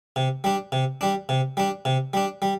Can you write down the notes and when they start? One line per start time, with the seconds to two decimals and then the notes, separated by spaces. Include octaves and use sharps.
0.16 C3
0.44 G3 D4
0.72 C3
1.01 G3 D4
1.29 C3
1.57 G3 D4
1.85 C3
2.13 G3 D4
2.42 G3